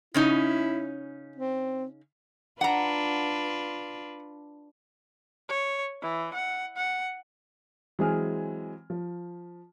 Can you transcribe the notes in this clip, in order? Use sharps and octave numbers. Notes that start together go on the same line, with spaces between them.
C#3 C#4 D#4 E4
C4
D4 F4 B4 F#5 A#5
C#5
E3
F#5
F#5
E3 F#3 G#3 C4 G#4 F6
F3